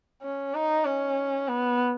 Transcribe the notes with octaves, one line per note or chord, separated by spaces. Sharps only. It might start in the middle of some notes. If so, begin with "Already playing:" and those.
C#4
D#4
C#4
B3